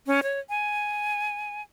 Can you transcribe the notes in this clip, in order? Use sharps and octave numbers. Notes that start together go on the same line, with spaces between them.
C#4
C#5
G#5